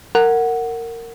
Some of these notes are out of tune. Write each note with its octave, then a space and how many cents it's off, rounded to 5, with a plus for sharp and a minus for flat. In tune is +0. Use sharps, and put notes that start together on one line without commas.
A#4 -20 F#5 +0